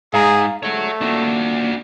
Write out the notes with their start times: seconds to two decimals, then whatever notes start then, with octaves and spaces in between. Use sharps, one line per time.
0.14 G#2 G#4 F5 A#5
0.63 D2 G#2 A3 C#5 F#5
1.01 D#2 A#2 D4 F#4